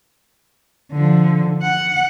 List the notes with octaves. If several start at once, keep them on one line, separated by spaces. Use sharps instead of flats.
D3 F3
F#5